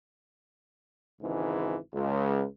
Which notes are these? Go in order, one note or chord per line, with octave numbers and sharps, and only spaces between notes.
G#1 C#2 G#2 E3
C#2